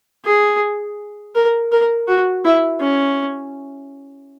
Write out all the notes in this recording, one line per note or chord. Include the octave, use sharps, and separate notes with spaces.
G#4
A#4
A#4
F#4
E4
C#4